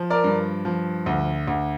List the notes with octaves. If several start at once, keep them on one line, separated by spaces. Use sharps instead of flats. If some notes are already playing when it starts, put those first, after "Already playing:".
Already playing: F3
A#4 D5
G2
F3
D2
D2